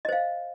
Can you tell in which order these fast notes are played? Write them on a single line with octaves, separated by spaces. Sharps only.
D#5 C5 F5